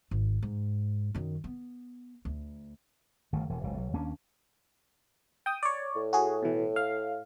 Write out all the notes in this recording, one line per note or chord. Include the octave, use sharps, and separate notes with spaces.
G#1
G#2
F#2 D#3
B3
D2
G1 D#3 A3
E1 E3
F#1 C#2
B1 F#3
D#2 A#3 C#4 D4
G5 D#6
C#5 D5
A2
F#4 G#4
B2 E3
F5